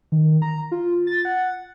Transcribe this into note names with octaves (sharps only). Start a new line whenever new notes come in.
D#3
A#5
F4
A6
F#5